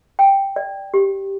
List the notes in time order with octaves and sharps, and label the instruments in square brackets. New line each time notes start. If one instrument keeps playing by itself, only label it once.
[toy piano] G5
D5
G4